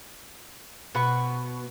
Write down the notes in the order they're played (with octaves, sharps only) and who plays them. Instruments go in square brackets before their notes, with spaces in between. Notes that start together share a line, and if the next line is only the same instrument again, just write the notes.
[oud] B2 [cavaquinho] F#5 B5 C#6